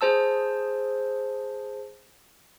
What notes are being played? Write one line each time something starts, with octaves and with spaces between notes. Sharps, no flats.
G#4 C5 A5 E6